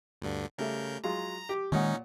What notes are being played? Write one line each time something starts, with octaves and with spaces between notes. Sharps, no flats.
D2 G2 D3
C#3 G3 A3 A#4 G6
F#3 G#3 F4 A#5
G4
A#2 D#3 G#3 C#4 D#4 C#5 F#5